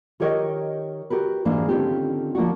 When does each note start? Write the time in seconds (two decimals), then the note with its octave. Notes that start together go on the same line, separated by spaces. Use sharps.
0.20 D#3 G4 A#4 C#5 D#5 G5
1.10 F#4 G4 A#4 B4
1.45 G#2 E3 G#3 A#3 D4 F#4
1.69 D3 D#3 C4 C#4 F4 G4
2.35 F3 A#3 D4 F#4